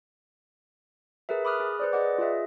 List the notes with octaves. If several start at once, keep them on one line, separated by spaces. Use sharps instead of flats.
G#4 A#4 B4 E5
B5 D6 D#6 F6 F#6
G#4
B4 C5 D5
G#4 B4 D5 D#5 F#5 D6
F4 G#4 D#5 E5